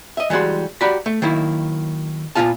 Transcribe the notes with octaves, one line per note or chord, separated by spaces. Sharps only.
D#5 E5
E3 G3 G#3 F#4 C6
F#4 G4 D5 A#5 B5
A3
D#3 F#3 A#3 E4
A#2 E3 B3 F4 F5 A5